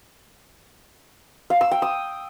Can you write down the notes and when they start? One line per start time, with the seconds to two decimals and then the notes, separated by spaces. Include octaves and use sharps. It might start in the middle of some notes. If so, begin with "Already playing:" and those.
1.50 F5
1.61 E6
1.71 G5
1.82 D#6